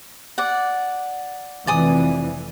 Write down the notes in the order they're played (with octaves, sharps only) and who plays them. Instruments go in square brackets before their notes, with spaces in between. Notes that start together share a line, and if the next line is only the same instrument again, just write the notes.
[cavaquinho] D5 F#5
[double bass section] F1 F2 E3 [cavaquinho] D5 G#5 D#6